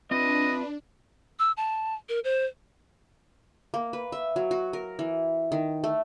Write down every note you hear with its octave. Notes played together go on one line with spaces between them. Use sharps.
C4 D4 F4 B4 D#5 E5
E6
A5
A#4
C5
A#3
B4
E5
F#3
F#4
A#4
E3
D#3
A3